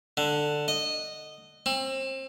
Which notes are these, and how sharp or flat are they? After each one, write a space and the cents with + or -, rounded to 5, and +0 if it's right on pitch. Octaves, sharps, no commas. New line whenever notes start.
D3 +10
D#5 -10
C4 +30